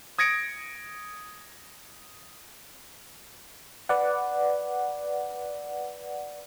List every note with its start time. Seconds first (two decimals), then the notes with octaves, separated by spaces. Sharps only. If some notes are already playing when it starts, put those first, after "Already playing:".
0.18 D#6 G#6 A#6 C#7 D7
3.89 B4 D5 F#5